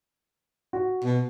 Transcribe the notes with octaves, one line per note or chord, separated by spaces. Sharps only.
F#4
B2